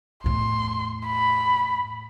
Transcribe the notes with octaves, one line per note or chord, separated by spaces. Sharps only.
E2 A2 C6
B5